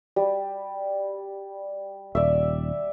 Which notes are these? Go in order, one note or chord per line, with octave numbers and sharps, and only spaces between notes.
G3
D#1 D5 E5